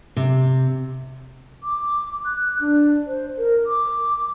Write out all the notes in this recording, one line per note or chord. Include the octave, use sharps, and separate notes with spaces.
C3
D6
F#6
F#6
D4
C5
A#4
D6